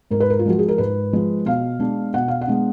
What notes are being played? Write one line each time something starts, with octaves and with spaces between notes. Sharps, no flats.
G#2 A#4
B4
A#4
F4
F3 G#3 F#4
G#4
A#4
G#2 B4
F3 G#3
B2 F5
G#3 B3 D4
B2 F#5
F5
F#5
G#3 B3 D4